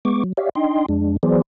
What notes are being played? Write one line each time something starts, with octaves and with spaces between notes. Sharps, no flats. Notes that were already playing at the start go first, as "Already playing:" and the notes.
G#3 B3 C#6 D6
F#3
G4 C#5 D5 E5 F5
D4 D#4 D#5 G5 C6
F2 G#3 D4
E3 F#3 B3 G#4 C5 D5